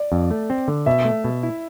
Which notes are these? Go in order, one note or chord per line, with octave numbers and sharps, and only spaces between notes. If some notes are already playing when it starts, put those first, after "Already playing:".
Already playing: D5
F2
A3
C4
D3
B2 E5
A3
B2
E4